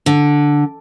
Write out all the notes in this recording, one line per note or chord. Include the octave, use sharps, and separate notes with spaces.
D3